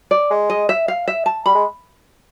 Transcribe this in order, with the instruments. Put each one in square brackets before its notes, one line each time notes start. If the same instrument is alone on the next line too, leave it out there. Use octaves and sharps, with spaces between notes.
[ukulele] D5
[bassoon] G#3
[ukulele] D#5
E5
F5
E5
A5
[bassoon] G3 [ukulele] B5
[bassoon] G#3